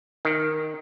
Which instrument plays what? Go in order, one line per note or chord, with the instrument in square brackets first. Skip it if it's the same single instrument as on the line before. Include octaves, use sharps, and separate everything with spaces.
[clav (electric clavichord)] D#3